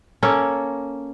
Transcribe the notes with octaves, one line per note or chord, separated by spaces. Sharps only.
A#3 C#4 A4